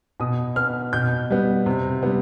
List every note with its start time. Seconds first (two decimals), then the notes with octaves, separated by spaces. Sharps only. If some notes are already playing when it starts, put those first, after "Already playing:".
0.20 B2 D#6
0.56 B3 F6
0.93 B2 G6
1.30 G3 B3
1.66 C3
2.03 G3 B3